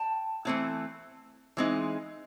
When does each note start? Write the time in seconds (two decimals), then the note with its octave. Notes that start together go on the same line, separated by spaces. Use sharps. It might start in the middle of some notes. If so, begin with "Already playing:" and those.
Already playing: G5 A5
0.45 E3 A3 C4 E4
1.57 E3 G#3 C4 D#4